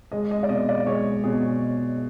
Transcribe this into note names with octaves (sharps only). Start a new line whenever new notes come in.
G#3 D#5
D#5
D5
B2 D#5
D5
G#3 C#5
B2 G#4